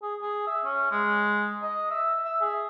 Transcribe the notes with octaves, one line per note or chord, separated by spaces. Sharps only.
G#4
G#4
E5
C#4
G#3
D#5
E5
E5
G#4